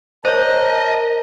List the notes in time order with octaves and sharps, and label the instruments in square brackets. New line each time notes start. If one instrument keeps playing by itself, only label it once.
[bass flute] A#4 [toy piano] C5 C#5 [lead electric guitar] D#5 [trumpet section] A5 A#5